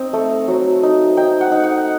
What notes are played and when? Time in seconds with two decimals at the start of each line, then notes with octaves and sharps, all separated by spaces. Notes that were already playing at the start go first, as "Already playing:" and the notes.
Already playing: C4 D#4 D#5
0.13 A3
0.48 F#3
0.83 D#4
1.17 D#4 G5
1.41 F#5
1.52 D#4
1.64 F#5